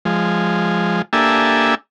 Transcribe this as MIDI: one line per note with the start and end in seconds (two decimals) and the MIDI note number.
0.05 1.02 53
0.05 1.02 56
1.13 1.75 58
1.13 1.75 62
1.13 1.75 67
1.13 1.75 69
1.13 1.75 76
1.13 1.75 80